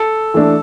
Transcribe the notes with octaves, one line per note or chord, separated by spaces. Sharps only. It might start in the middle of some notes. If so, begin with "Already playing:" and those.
Already playing: A4
E3 A3 D4